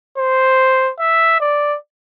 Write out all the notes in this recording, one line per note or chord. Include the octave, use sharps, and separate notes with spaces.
C5
E5
D5